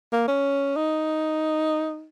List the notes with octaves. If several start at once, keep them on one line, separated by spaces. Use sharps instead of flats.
A#3
C#4
D#4